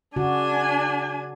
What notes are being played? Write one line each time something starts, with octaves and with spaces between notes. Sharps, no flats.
C#3 D4 F#4 G#5